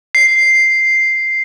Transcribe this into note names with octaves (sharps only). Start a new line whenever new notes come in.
C7